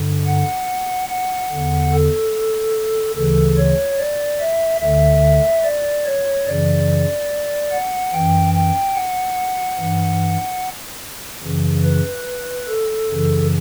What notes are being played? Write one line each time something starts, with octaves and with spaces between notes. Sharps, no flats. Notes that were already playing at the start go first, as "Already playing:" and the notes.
Already playing: G2 D3
F#5
F#5
E2 D3
A4
D2 C#3 E3 A4
C#5
D5
E5
D2 D3 E5
D5
C#5
F#2 C#3 E3 D5
F#5
F#2 E3 G5
G5
F#5
G2 E3
F#2 C#3 E3
B4
A4
F#2 C#3 E3